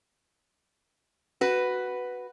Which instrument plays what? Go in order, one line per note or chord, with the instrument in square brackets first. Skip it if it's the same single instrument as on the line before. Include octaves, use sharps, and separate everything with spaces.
[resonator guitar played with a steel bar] F#4 B4